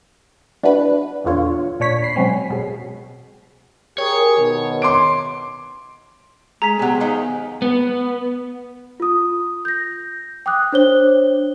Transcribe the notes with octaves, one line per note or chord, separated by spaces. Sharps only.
D4 E4 F#4 B4
A#1 E2 D3 F4 C#5
A#2 D4 C#5 B6
B5 C7
B2 F#3 G#3 C4 C#4
B2 G#3
G4 G#4 A#4 C#5
B2 D#3
C6 D6 D7
G#3 G#4 A#5 B6
C3 F#3 B3
D#3 F3
B3
F4 D#6
G6 A#6
G5 D6 D#6 F#6
D4 C5 C#5 G7